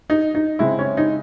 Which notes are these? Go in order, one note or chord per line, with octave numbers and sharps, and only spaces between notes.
D#4
D#4
C#3 G#3 C4 E4
C#4
D#4